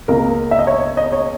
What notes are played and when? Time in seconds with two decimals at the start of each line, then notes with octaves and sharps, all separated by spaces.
0.08 C#2 B2 A#3 A#4
0.51 E5
0.59 D#5
0.67 C#5
0.97 D#5
1.12 C#5